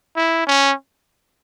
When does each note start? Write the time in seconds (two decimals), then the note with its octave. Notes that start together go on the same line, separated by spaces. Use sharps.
0.16 E4
0.47 C#4